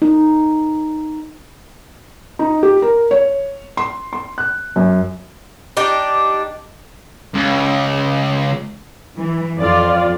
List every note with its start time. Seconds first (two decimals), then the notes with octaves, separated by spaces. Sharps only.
0.02 D#4
2.39 D#4
2.63 G4
2.82 A#4
3.11 C#5
3.77 C6
4.13 C6
4.38 F#6
4.76 F#2
5.77 D4 D#4 G4
7.34 C#2
9.16 E3
9.58 F2 F4 D5